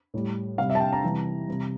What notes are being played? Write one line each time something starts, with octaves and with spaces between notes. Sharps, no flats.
A2 G3
C3 G3 F5
E5
A5
G5
A#5
C3 E3 G3
C3 G3